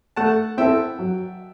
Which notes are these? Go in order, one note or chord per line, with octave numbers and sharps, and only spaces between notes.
A3 F#5 A5
C4 E4 A4 E5 G5
F#3